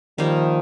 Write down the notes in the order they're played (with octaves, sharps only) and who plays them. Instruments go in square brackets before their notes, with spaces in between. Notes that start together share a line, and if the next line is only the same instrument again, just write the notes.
[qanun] D#3 G3 A#3 [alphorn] F3